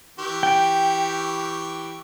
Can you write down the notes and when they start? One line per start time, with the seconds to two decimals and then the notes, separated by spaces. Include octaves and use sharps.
0.19 E3 G4 C#6
0.43 G5